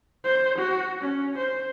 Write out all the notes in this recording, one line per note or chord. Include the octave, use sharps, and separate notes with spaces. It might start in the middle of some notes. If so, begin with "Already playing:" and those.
C5
F#4
C#4
C5